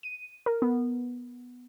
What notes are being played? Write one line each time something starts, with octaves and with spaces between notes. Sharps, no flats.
D#7
A#4
B3